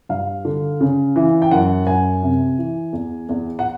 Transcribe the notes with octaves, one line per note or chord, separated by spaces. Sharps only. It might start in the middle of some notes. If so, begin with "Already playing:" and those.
G2 F5
D3
C#3
E3
G5
F#2 F#5
F#2 G#5
C3
E3
E2
E2
F#5